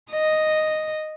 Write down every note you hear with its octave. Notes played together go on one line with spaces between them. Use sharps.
D#5